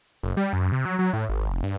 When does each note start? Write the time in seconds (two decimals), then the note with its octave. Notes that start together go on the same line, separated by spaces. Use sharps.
0.23 F#1
0.37 G3
0.53 F#2
0.72 C3
0.85 F#3
0.99 F#3
1.13 A2
1.29 G#1
1.50 F1
1.63 G2